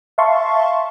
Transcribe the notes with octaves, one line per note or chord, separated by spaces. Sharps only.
E5 F5 A5 C6 C#6